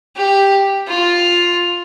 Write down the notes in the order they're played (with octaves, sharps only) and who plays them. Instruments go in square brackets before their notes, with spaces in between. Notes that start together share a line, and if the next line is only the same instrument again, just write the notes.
[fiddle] G4
F4